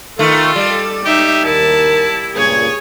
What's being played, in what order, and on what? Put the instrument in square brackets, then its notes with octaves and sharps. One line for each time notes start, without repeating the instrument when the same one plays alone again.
[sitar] D#3 A3 [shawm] F4 [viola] A4
[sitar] G3
[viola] D#4 E5 [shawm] G4
[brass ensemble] D#2 A#4 [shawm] E4 [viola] A5
[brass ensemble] C#2 G2 A#2 [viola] G#4 C#5